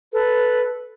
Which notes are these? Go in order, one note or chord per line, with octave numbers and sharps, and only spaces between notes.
A4 B4